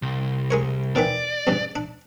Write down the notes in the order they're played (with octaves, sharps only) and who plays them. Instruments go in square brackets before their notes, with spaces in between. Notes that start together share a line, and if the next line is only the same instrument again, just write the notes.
[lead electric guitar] C2
[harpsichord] G#3 A#4 C#5
[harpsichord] B2 D#3 E3 [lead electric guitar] D5
[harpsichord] E2 G2 C#3
D4